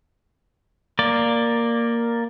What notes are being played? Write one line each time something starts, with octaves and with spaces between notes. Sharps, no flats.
A#3 D5